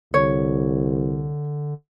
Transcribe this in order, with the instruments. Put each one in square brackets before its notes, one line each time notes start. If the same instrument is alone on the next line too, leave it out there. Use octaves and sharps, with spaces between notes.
[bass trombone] C2 [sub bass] D3 [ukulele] C#5